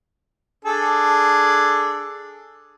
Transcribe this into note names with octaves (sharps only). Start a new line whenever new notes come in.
D4 G#4 A4